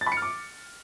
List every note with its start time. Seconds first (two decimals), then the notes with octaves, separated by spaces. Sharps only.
0.01 A6
0.06 B5
0.12 C#7
0.17 F6
0.22 D6